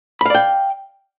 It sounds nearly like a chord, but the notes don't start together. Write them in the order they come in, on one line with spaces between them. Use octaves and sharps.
B5 F5 D5 G5